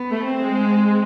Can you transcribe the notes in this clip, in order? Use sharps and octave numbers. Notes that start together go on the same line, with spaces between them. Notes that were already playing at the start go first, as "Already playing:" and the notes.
Already playing: B3
A3
C4
G#3
C4